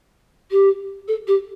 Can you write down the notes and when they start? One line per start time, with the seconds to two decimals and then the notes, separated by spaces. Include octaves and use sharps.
0.51 G4
1.08 A4
1.27 G4